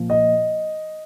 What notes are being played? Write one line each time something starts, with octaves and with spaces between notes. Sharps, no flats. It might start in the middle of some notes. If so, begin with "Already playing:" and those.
Already playing: A#2 F3
D#5